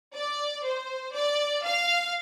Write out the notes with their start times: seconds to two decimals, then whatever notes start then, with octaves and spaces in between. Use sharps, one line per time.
0.15 D5
0.64 C5
1.14 D5
1.64 F5